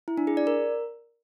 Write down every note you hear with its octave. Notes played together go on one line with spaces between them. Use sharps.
E4
D4
G#4
D5
A#4